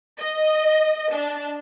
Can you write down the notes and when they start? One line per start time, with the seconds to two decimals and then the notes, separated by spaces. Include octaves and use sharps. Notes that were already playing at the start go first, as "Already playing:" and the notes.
0.19 D#5
1.12 D4